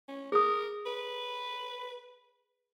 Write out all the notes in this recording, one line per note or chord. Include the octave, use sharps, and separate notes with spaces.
C#4
G#4 A#4 D#6
B4